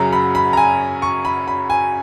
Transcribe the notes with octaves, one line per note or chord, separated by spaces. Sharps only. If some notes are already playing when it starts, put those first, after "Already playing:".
Already playing: F#2 C#3 F#3 A#5
B5
B5
A#5
G#5
C#6
B5
B5
G#5